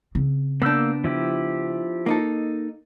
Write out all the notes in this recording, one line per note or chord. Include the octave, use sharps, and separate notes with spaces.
C#3 C4
A#3 B3 D4 E6 G6
F3 E4 G4
A#3 D#4 A4